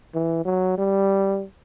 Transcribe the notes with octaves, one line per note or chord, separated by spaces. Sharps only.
E3
F#3
G3